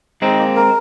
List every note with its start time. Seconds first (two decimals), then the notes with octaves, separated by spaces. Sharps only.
0.22 G#3 C4 D#4
0.39 A#3
0.56 A#4